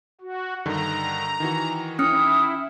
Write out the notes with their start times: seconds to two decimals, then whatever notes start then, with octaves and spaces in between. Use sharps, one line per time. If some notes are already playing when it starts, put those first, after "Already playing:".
0.21 F#4
0.66 G2 D3 D#3 A#5
1.40 D#3 E3 F#4
1.99 C#4 E4 D#6 F6 C#7